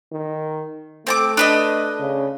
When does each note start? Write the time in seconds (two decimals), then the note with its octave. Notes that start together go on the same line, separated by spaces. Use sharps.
0.13 D#3
1.07 A3 C4 A5 D6
1.37 D4 B4 D#5
2.00 C#3